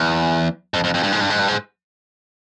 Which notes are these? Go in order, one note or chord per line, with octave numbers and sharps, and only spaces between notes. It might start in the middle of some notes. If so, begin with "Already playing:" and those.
Already playing: E2
F2
F2
F2
G2
G#2
G2
G#2
G2
G#2